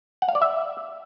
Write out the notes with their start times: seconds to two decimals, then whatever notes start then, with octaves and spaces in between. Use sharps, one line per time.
0.22 F#5
0.29 F5
0.35 D5
0.42 E5